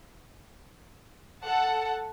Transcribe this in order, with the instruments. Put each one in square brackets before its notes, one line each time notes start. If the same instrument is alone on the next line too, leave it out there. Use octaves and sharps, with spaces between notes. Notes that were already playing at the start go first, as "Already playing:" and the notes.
[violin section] A4 F#5 A5